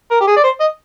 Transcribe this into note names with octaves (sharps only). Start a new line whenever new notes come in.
A#4
G4
G#4
D5
C5
D#5